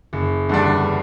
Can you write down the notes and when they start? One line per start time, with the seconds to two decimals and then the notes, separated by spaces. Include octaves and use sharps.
0.13 F#1
0.49 E2 D3 G3 D4